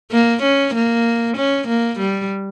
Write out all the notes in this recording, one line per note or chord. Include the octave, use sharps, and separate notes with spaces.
A#3
C#4
A#3
C#4
A#3
G3